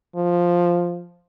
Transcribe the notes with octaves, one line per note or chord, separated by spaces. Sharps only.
F3